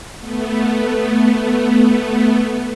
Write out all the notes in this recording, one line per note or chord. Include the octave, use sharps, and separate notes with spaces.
A3 B3